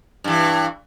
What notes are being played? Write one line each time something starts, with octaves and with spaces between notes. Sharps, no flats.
G2 E3